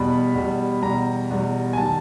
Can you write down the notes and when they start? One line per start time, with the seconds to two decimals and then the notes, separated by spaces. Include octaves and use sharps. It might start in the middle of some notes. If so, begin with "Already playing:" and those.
Already playing: E2 B2 G3 B5
0.34 E2 B2 G3
0.82 E2 B2 G3 A#5
1.31 E2 B2 G3
1.73 G#5
1.77 D#3 G3 A5